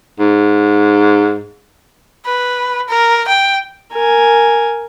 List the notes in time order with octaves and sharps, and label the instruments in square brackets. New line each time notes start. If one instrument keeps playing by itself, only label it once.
[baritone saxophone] G#2
[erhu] B4
A#4
G5
[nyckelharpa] A#4 G#5